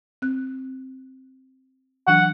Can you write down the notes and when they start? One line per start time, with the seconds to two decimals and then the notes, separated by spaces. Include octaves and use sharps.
0.22 C4 F#6
2.08 E3 F#3 D4 F#5